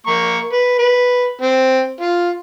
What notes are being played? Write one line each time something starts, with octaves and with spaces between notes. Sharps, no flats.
A#3 A#5 C#6
B4
B4
C4
F4